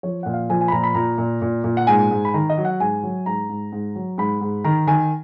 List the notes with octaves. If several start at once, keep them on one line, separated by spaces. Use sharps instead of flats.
F3 C#5
A#2 F#5
F5
F3 G#5
G#5
B5
A#2 A#5
B5
A#2 A#5
A#2
A#2
A#2
F#5
G#2 G#5
G#2
B5
D#3 A#5
D#5
F#3
F#5
G#2 G#5
F#3
G#2 A#5
G#2
G#2
F#3
G#2 B5
G#2
D#3 A#5
D#3 G#5